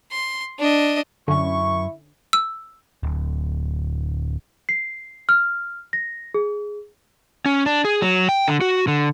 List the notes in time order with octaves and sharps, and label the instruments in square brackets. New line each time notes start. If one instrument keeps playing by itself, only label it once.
[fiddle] C6
D4 D#5
[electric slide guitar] F#2 [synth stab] D3 C#4 [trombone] E4 [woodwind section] C#6
[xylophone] E6
[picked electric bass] D1
[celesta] C7
F6
A#6
G#4
[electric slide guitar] C#4
D4
G#4
F#3
G5
D3
F#4
D3